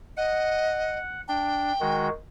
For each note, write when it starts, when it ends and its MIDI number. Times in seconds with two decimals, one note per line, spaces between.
0.17 0.98 75
0.17 1.21 78
1.28 1.72 62
1.28 2.07 79
1.81 2.10 51
1.81 2.10 56
1.81 2.10 66